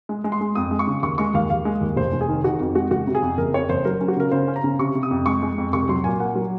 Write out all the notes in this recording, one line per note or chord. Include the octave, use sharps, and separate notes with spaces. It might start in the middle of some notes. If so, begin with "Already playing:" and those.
G#3
G#3
C6
G#3
F2 D#6
G#3
C#6
C#3
D#2 C#6
G#3 C#6
D#2 F5
D#2 F5
G#3
D#2
F1 C5
F1
G#4
D#3
D#3 F#4
F2
G#3 F#4
F#1 F#4
C3
G#4
F2
F#1 A#4
F2 C#5
F#1 C5
F#3 A#4
C#4
F#4
C#3 A#4
C#3 C5
C#4
A#5
C#3
C3 C#6
C3
D#6
F2
G#3 C#6
G#3
F2
C2 C#6
F#3 C6
A#2 G#5
A#3 F#5
F#3